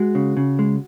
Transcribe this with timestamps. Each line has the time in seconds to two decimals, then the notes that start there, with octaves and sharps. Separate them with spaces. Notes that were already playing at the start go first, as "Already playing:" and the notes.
Already playing: G#3 F#4
0.15 C#3
0.37 C#3
0.59 G#3